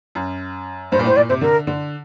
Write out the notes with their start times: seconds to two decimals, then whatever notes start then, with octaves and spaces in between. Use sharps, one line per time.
0.15 F#2
0.92 G2 C5
0.99 A#2
1.04 A2 C5
1.16 A#2 D5
1.29 C3 C5
1.41 D3 A#4
1.67 D3